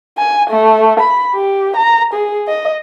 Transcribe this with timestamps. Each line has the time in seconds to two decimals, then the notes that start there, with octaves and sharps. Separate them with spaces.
0.18 G#5
0.50 A3
1.00 B5
1.34 G4
1.76 A#5
2.14 G#4
2.48 D#5